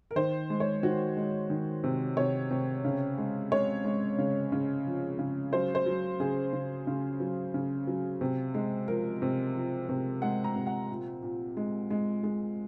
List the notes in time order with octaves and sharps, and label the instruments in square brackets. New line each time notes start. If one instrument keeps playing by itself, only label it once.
[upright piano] A#4
D#3 C5
G#3
C#5
D#3 F#4
G#3
D#3
C3
C3 C#5
C3
C#3
G#3
G#3 C#5
G#3
C#3
C#3
F3
C#3
F#3 C5
C5
F#3
C#3 G#4
C#3
C#3
F#3
C#3
F#3
C3
G#3
F3 A#4
C3
F3
C3
G#3 F#5
A#5
C3
F#5
A#2
A#2
G#3
G#3
G#3